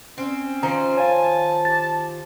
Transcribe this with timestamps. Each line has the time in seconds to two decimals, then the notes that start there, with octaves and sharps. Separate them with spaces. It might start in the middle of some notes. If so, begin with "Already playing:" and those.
0.18 C4 C#4
0.63 D#3 F3 C5 A#5
0.97 C#5 F5 G#5 A5
1.65 G4 A6